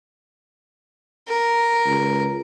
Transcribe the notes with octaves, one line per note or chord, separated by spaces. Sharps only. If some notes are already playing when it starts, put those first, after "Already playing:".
A#4
C#2